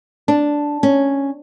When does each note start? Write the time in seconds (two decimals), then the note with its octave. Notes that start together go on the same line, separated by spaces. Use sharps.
0.28 D4
0.83 C#4